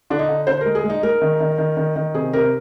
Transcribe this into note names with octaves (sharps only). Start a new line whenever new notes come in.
D3 D4
D#4
D3
D3 C5
G#3 A#4
G#4
G#3
D#4
G#3 A#4
D#3
D#3
D#3
D#3
D#3
C3 G#4
C3 A#4